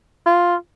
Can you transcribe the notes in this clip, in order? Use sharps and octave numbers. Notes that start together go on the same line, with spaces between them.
F4